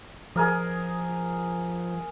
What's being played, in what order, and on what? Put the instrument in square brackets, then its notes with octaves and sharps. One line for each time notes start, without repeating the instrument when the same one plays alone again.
[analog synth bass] F3 [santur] G#4 A#4 D#5